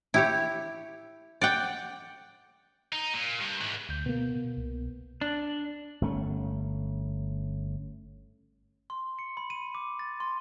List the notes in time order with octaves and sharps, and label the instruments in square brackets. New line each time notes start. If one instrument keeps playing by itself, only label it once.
[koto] E4 G4 C#5
D5 F#5 G5
[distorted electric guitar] D#4
A#2
G2
G#2 E3
[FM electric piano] D2 G6
[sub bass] B2 [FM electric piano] A#3 B3
[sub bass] B2
C2
[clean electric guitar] D4
[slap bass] G1 A3 C#4
[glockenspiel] C6
C#7
B5
D#7
D6
A6
C6